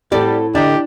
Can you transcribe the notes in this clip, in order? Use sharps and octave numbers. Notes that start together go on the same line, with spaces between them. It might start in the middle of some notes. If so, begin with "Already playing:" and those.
A2 G3 C4 F#4 G4 A4 D5
D3 D4 G4 D#5 A#5